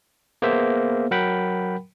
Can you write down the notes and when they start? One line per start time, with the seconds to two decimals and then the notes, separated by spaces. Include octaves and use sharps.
0.42 A#3 B3 G#4 C5 E5
1.11 F#3 A#4 F#5 G5 B5